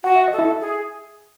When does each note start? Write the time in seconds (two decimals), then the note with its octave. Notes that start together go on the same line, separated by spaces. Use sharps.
0.04 F#4 F#5
0.16 E5
0.28 A4 D#5
0.38 E4 E5
0.61 G#4